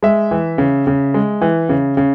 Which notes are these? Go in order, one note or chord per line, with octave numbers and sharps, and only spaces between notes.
G#3 E5
E3
C#3
C#3
G#3
E3
C#3
C#3